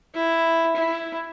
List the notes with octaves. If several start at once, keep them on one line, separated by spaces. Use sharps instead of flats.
E4
E4